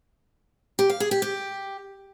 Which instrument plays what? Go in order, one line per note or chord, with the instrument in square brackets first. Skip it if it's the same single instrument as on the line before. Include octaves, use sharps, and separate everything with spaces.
[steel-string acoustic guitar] G4
F5
G#4
G4
G4